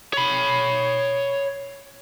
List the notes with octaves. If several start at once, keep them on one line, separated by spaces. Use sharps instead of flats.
C#5 B5